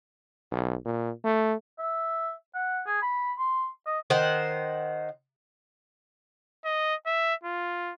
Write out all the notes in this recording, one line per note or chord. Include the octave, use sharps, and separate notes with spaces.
B1
A#2
A3
E5
F#5
G#4
B5
C6
D#5
D#3 C5 F#5
D#5
E5
F4